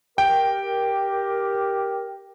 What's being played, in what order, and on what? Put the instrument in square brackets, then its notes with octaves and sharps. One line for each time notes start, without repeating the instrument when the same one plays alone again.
[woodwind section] G4 A#4 [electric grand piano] G5